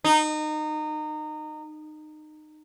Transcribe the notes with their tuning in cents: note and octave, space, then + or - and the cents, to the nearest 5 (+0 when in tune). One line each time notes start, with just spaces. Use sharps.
D#4 -25